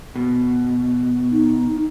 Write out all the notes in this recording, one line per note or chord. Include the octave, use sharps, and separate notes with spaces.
B2
D#4